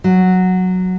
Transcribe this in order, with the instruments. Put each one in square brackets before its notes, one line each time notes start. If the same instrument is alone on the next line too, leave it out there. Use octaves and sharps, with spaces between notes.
[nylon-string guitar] F#3